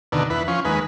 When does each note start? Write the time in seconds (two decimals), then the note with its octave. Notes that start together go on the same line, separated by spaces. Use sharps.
0.12 D#2 B2 D3
0.30 E2 B4
0.48 F3 C#4
0.65 D#2 G#3 B4